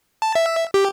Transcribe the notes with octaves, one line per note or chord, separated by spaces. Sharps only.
A5
E5
G4